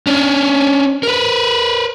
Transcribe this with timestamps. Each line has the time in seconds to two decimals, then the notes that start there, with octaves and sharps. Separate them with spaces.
0.07 C#4 D4
1.03 A#4 B4